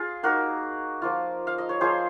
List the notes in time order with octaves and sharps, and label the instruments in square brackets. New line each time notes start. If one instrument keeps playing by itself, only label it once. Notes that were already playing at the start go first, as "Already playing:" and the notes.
Already playing: [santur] F4 G#4
A#3 D#4 F#4 A#4
F3 A#3 F4
F5
D#5
C#5
F3 A#3 F4 G#4 C5